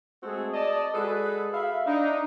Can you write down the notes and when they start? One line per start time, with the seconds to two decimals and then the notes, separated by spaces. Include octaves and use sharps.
0.23 G#3 A3 C4 F#4 G#4 A4
0.54 D5 D#5 A5
0.94 G#3 F#4 G#4 A4 B4
1.54 E5 F5 B5
1.86 D4 D#4